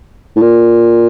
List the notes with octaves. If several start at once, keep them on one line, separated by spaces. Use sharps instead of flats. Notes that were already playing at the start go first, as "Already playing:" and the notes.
A2
A#2